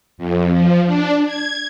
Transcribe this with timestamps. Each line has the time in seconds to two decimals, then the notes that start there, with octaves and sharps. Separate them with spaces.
0.18 F2
0.52 F3
0.86 D4
1.26 G#6